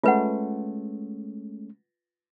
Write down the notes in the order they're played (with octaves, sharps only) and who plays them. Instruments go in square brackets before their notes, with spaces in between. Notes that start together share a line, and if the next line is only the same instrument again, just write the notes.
[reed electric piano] G#3 A3 C#4 [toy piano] F4 B4 F#5